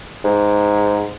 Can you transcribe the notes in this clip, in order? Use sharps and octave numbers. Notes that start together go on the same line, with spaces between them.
G#2